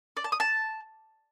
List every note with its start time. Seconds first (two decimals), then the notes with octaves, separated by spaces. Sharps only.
0.17 D5
0.24 A5
0.32 D#6
0.40 A5